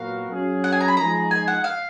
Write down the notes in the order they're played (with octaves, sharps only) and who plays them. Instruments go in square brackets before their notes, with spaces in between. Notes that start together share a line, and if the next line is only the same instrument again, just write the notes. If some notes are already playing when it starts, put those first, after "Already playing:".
Already playing: [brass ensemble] A#2 F#3 B3 F#4 A#4 [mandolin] F5
[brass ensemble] F#3 C#4 G#4
[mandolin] F#5
G#5
A#5
B5
[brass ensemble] F3 G#3 D#4 G#4 [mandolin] A#5
[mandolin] G#5
F#5
F5